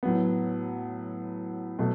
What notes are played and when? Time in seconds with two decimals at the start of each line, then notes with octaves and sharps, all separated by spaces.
0.03 A2 F#3 B3
1.79 B2 F#3 A3